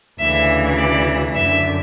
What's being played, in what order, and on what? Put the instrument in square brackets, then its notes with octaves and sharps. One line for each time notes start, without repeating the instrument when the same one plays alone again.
[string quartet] D2 C#3 E3 E5
D5
F#2 D3 E5